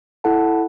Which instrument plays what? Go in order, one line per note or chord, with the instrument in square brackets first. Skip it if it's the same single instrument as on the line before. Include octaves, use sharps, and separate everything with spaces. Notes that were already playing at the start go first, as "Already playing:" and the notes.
[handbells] E4 A4 F#5 A5